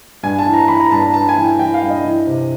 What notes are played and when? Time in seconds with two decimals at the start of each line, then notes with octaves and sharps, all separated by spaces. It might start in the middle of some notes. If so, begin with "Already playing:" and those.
0.23 G2 G#5
0.39 A5
0.46 E3
0.53 A#5
0.68 E3 B5
0.80 A#5
0.91 G2 A5
1.03 A#5
1.14 G2 A5
1.29 G#5
1.36 E3
1.44 G5
1.59 E3 G5
1.74 F5
1.83 G2
1.90 D#5
2.05 E3
2.27 C3